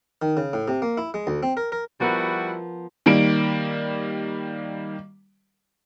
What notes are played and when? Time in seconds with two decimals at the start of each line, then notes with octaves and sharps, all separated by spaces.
0.22 D#3
0.37 C#3
0.53 A2
0.68 C3
0.82 A#3
0.98 E4
1.14 G#3
1.27 D2
1.43 C4
1.57 A#4
1.72 A#4
2.00 F3 G3 B3 E4 F#4 A#4
3.06 D#3 G3 A#3 D7